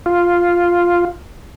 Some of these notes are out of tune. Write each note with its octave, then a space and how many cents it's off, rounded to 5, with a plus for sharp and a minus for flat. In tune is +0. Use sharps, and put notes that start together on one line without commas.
F4 +0